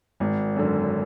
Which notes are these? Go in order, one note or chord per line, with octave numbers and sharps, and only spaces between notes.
G#1
F#2 D3